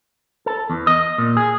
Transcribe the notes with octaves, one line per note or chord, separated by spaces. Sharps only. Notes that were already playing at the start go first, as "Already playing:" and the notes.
A4
E2
D#5
A#2
G#4